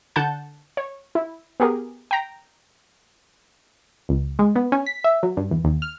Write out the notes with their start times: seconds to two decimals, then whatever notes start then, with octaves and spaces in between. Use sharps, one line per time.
0.16 D3 F#5 A5 G6
0.77 C#5
1.15 E4
1.60 B3 G4 G#4 A#4
2.11 G5 A#5
4.09 C#2
4.39 G#3
4.56 B3
4.72 C#4
4.86 B6
5.04 E5
5.23 F#3
5.37 G2
5.51 E2
5.64 D#2
5.82 F6